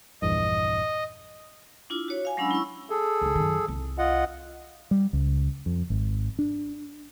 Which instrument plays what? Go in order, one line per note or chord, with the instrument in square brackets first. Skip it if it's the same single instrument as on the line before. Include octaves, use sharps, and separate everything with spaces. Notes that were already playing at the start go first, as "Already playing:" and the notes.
[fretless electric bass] A#1 E2 G2 [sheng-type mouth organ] D#5
[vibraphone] D4 E4 F4 D6
F#4 C#5
F5 G#5
F#3 G#3 C#4 D4 B5 E6
E4 C#6 E6
[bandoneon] G#4 A4
[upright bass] C#2 D3
F#2 D#3
C2
[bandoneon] F4 D#5 F#5
[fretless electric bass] G3
C#2
F2
G#1
D4